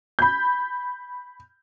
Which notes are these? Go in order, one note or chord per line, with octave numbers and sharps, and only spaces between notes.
B5 G6